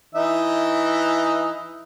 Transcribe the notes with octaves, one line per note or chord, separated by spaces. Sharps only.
E3 D#4 E5